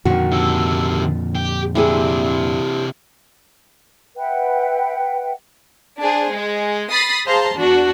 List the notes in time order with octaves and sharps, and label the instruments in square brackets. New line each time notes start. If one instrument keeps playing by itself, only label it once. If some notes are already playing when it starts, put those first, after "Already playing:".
[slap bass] F2 A#2 D3 [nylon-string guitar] D#3 F#4
[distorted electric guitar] C3 A4
G4
[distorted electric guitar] C3 D4 [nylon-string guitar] E4 G4 G#4
[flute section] B4 E5 F#5 G5
[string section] D4 G#4 C5
G#3
B5 D#6 A6 C7
G#4 C5 F5 A5 A#5 C6
E2 D4 F#4